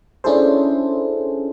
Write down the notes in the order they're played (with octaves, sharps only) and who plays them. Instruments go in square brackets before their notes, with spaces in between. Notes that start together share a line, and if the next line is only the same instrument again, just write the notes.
[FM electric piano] C#4 D4 E4 G#4 A4 C5